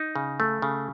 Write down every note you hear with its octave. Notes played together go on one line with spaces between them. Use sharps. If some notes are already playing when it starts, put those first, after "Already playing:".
Already playing: D#4
C#3
A3
C#3